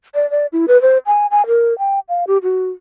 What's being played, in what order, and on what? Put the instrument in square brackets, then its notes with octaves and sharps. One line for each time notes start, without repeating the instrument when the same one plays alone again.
[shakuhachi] D5
D5
E4
B4
C5
G#5
G#5
A#4
G5
F5
G4
F#4